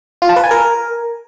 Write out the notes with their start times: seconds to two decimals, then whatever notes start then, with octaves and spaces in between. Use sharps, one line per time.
0.22 F4
0.29 A5
0.36 B4
0.44 G#5
0.51 A#4